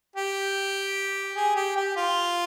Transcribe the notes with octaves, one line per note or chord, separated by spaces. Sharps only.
G4
G#4
G4
G4
F4